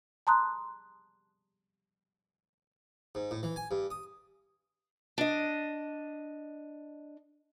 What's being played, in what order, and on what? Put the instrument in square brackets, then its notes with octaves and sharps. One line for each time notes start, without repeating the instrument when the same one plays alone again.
[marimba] A5 A#5 C6 D#6 F#6
[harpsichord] G#2
A2
E3
G#5
G2
D#6
[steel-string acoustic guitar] D4 D#5